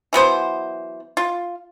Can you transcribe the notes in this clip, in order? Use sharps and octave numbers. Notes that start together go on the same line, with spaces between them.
E3 F#3 B3 C5
F4